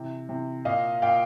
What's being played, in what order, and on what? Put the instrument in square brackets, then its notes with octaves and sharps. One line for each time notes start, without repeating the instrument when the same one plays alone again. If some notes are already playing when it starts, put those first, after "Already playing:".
Already playing: [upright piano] C3 E3
C3 E3
A#2 D#5 F5
A#2 F5 G5